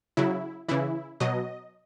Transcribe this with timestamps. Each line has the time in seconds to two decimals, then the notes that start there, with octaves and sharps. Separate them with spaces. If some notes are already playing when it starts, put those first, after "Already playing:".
0.17 C#3 F#3 E4
0.69 C#3 E3 E4
1.20 B2 F#3 D#5